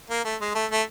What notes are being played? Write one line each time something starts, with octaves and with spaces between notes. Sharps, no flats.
A#3
A3
G#3
A3
A3